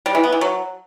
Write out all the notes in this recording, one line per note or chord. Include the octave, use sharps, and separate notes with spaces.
G3
E3
B3
E3
F#3